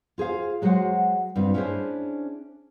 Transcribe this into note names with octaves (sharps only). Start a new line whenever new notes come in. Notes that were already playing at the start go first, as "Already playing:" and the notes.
F4 G#4 C5 F5
F#3 G#3 F#4 C5 F#5
G2 C4 F4
C#4 D4 E4 G#4 C5